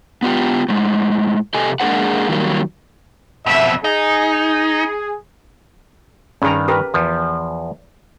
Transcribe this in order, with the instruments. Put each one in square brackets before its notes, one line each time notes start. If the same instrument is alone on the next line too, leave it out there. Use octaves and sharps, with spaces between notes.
[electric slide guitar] B3 F4 G4 G5
A2 G#3
C3 G4 A4 D#5 G#5
G#3 A#3 D4 G#4 C5 F#5
D#3 F#3 G3 A#3
[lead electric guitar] F2 B2 [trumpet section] E5
[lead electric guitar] D#4 [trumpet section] G#4
[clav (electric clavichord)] G2 D#3 [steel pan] C#4 G#4 A#5
[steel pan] G4 A#4 B4
[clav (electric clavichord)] E2 F3